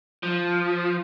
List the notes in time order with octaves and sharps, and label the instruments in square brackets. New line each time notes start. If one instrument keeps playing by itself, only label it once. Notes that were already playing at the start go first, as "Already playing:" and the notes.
[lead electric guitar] F3